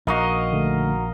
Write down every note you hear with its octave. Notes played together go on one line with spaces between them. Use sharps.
A#1 D#4 F#4 A#4 D#5 F5
D3 A3